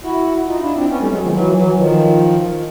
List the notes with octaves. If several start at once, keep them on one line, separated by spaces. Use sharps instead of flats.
E4 F#4
D#4 F4
D4 E4
C4 D4
B3 C#4
G3 A3
F#3 G#3
D#3 F3
E3 F#3
E3 F#3
E3
D#3 F3